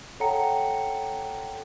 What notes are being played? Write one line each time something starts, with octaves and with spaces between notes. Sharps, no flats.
A4 C#5 F#5 G5 A#5 C#7